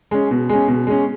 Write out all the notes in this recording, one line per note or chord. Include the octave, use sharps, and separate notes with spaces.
G#3 C#4
B2
G#3 C#4
B2
G#3 C#4